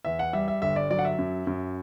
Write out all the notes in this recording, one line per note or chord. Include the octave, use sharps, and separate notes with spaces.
E2 E5
F#5
G3 E5
E5
G1 E5
D5
F#3 D5
F#5
E5
F#2
F#2